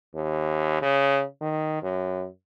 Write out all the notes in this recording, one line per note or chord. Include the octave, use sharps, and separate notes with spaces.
D#2
C#3
D#3
F#2